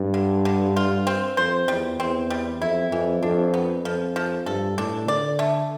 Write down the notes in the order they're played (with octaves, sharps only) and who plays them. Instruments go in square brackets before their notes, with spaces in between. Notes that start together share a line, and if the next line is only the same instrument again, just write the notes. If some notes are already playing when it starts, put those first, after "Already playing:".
Already playing: [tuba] G2 [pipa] G3
[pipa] D3
D3
F4
C4
[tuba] F2 [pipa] C5
[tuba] E2 [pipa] G3
[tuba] E2 [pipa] C4
[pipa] G3
[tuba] F2 [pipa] E4
[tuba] F2 [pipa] E3
[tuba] F2 [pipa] D4
[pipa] B3
[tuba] F2 [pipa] F3
[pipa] F3
[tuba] G2 [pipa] A4
[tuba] A2 [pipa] D4
[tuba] D3 [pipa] D5
[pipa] A3